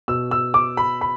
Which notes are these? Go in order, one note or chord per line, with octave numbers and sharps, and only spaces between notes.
B2 E6
E6
D6
B5
B5